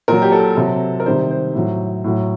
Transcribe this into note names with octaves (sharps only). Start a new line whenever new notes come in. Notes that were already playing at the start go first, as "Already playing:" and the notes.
A#2 F#3 A#4
G4
A4
C3 F#3
A#4
C3 D#3 G3 C5
C5
A2 F#3
A2 F#3